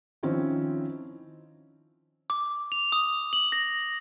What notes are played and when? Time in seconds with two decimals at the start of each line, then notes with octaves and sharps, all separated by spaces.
0.23 D#3 F3 C4 C#4 D#4 E4
2.30 D6
2.72 F7
2.92 D#6
3.33 F#7
3.52 A#6